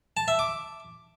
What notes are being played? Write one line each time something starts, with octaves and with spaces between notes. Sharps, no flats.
A5
E5
D6